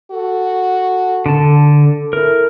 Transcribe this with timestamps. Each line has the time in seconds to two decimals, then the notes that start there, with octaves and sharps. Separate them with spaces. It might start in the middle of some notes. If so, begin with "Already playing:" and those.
0.11 F#4 A4
1.26 D3 A5
2.13 E4 A#4